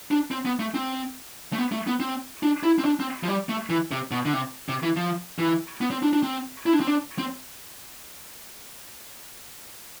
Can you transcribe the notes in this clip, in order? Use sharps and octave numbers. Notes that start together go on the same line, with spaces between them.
D4
C4
B3
A3
C4
A3
B3
A3
B3
C4
D4
E4
C4
D4
C4
F3
G3
A3
E3
C3
B2
D3
C3
C3
E3
F3
E3
B3
C4
D4
D4
C4
E4
D4
C4
D4
C4